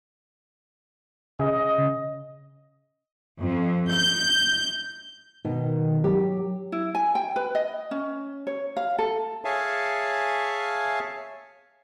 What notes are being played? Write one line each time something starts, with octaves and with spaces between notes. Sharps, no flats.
C#3 D#5
F2
G6
B2 D#3
F#3 G4
E4
G#5
G5
B4
D#5
C#4
C#5
F5
A4
G#4 C#5 E5 F5 G#5 A5